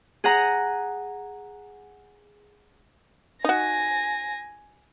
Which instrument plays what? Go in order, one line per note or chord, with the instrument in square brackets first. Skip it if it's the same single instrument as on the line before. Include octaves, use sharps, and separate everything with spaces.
[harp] G#4 F#5 A#5
[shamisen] D#4 F#4 [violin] G#5 A#6